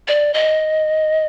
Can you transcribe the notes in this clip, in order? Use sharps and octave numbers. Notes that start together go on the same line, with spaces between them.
D5
D#5